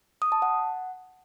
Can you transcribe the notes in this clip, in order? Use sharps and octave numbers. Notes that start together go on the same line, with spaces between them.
D#6
A5
F#5